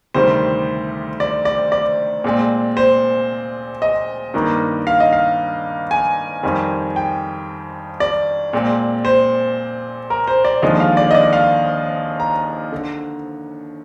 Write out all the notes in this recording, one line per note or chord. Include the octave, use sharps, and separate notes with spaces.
D2 C3 D#3 G3 C5
D5
D5
D5
A#2 G#3 C4
C5
D#5
G2 D#3 A#3
F5
D#5
F5
G#5
F2 D#3 G3 C4
G5
D5
A#2 G#3 C4
C5
A#4
C5
D5
D#2 D3 F3 G#3 D#5
F5
D5
D#5
D5
F5
A#5
D3